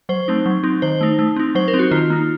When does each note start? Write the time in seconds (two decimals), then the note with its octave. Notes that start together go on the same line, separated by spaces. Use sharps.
0.09 F#3 C5
0.28 A3 C4 D#4
0.46 F#3
0.63 C4 D#4
0.82 D#3 C5
1.01 A3 D#4
1.19 A3
1.36 C4 D#4
1.55 F#3 C5
1.68 A#4
1.74 C4 D#4
1.79 F#4
1.91 D#3 F4
2.10 A#3 D#4